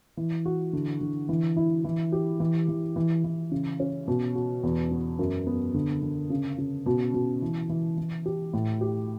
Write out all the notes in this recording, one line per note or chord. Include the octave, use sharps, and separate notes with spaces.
E3
F#4
D3
D3
E3
E4
E3
G4
E3
E3
E3
E3
C#3
C#4
B2
F#4
E2
B3
F#2
B3
D3
D3
C#3
C#3
B2
B2
E3
E3
E3
G4
A2
G4